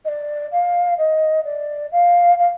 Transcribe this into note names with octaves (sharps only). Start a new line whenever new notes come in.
D#5
D5
F5
D#5
D5
F5
F5